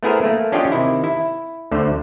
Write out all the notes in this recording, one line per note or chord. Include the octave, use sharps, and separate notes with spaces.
A3 B3 E4 G#4 A#4 C5
A3 A#3
C#4 D4 F4 G4 D#5 G5
C3 D#3 E4
E4
D2 D3 A3 C5